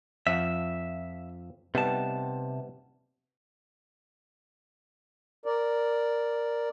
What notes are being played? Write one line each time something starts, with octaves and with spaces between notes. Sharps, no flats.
F2 F3 E5 F#5
C3 G3 B3 D#4 A5
A#4 D5